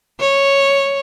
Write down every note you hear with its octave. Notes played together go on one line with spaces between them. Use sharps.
C#5